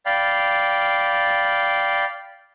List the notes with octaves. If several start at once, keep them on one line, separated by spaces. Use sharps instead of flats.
D5 F5 G5 B5